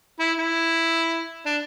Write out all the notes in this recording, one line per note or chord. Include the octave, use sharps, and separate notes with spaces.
E4
E4
D4